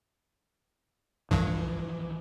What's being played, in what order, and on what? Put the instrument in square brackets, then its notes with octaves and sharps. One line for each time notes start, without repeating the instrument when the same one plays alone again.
[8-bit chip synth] C2 G2 [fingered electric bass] E3 F3